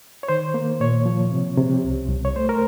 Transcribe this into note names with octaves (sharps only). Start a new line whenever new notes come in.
C#5
D#3 C5
A#3
A#2 C#5
F3
C3
C3
C2
C2
C#5
A3 C5
A#4